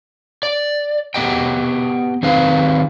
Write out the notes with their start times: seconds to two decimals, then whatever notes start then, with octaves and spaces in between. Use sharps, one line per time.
0.43 D5
1.14 B3 G4 D#5 G5
2.23 D#3 C4 D#4 B4 F5